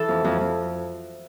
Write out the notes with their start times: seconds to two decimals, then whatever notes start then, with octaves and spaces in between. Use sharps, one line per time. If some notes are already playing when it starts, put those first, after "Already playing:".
Already playing: E3 A4
0.08 F2
0.24 F2
0.41 F2